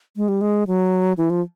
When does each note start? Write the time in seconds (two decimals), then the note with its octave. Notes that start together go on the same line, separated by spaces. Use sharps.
0.17 G#3
0.28 G3
0.41 G#3
0.67 F#3
1.18 E3
1.30 F3